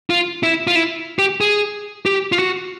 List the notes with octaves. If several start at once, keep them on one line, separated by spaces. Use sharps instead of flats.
F4
E4
F4
E4
G4
G#4
G4
F4
F#4